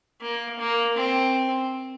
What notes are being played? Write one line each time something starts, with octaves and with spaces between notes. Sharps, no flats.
A#3
A#3
C4